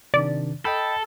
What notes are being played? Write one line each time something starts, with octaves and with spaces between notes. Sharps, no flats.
C3 D#3 D4 D5
A4 D#5 G5 B5